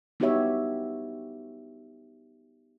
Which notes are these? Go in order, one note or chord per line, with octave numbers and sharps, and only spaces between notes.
B3 D#4 F#4 G4 C#5 E5